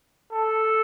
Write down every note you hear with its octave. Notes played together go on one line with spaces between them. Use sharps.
A4